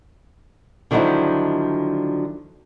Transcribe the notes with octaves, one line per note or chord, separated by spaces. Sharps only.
D3 D#3 F3 F#3 D#4 E4